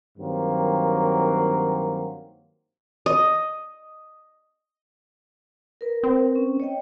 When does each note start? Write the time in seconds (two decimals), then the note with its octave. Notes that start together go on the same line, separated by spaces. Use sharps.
0.18 G2 D#3 F#3 A#3 C4
3.06 D#5
5.81 A#4 B4
6.03 C4
6.36 C#4
6.60 C#5 D#5 G5